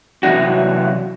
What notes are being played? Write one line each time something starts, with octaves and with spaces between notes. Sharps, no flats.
C3 E3 F#3 D4 F#4